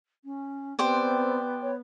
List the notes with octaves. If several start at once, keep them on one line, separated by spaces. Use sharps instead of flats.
C#4
B3 C4 G4 C5 D5
C#5